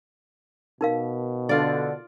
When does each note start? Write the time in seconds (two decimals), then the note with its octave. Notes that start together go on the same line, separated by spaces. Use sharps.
0.81 B2 D#4 A#4 F5
1.49 D3 F4 D5